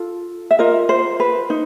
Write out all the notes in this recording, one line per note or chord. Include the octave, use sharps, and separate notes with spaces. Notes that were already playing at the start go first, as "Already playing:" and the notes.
Already playing: F4 A4
E5
F4 A#4 D#5
C5
B4
D#4